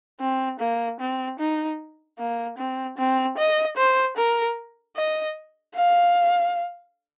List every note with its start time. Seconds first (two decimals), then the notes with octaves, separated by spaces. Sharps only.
0.20 C4
0.60 A#3
1.00 C4
1.39 D#4
2.19 A#3
2.58 C4
2.98 C4
3.37 D#5
3.77 C5
4.17 A#4
4.96 D#5
5.75 F5